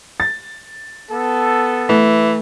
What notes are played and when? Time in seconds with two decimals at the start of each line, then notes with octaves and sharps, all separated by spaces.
0.20 A6
1.10 B3 A4
1.89 E3 A3